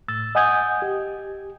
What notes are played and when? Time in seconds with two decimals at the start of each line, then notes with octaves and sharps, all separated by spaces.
0.08 A2 E6 A6
0.35 D#5 F#5 G#5 D#6 G6 G#6
0.82 G4